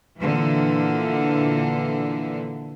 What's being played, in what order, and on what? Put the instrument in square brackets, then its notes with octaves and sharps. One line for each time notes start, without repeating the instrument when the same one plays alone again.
[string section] A#2 D3 E3